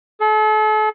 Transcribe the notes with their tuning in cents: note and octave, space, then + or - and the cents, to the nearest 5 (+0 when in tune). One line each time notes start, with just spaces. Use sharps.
A4 -40